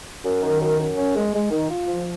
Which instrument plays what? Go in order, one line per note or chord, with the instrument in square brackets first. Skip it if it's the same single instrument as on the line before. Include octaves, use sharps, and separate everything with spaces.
[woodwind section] F#2
D#3
F#2
F#2
C#4
G#3
G#3
D#3
F4
F3